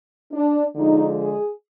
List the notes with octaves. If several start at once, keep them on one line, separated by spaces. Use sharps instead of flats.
D4
D3 F3 G#3 D#4
G#4